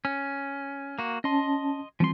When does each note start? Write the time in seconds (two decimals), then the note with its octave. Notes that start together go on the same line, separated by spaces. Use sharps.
0.05 C#4
0.99 A#3 F#4
1.24 C#4 D#5 A5 C6
2.00 E3 F3 G3 C4 C6